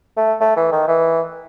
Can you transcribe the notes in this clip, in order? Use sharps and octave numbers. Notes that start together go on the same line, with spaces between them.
A3
A3
E3
D#3
E3